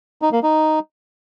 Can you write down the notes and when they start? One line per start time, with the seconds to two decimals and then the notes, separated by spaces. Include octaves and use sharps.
0.22 D#4
0.32 A#3
0.43 D#4